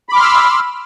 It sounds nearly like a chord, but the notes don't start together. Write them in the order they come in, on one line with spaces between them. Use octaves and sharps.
B5 D6 F6 C6 E6